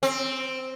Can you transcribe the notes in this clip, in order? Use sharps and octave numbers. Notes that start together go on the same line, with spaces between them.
C4